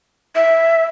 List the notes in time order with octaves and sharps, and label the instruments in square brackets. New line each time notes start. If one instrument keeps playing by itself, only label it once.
[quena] E5